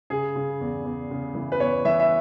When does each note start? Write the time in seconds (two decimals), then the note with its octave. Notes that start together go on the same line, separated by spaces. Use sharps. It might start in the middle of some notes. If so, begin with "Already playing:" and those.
0.10 C#3 G#4
0.36 C#3
0.61 E2
0.85 E2
1.11 C#3
1.35 E3
1.52 B4
1.60 E2 C#5
1.85 E3 E5
2.00 E5